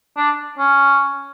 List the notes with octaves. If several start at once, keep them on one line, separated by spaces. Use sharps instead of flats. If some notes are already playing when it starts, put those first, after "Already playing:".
D4
C#4